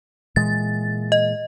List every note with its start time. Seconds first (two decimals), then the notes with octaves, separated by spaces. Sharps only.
0.36 A#2 E3 G#3 A6
1.12 D#5